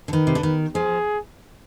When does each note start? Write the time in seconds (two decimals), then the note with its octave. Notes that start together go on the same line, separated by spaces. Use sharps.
0.08 D3
0.13 D#3 B4
0.27 C3
0.35 D3
0.43 D#3
0.75 F3 G#4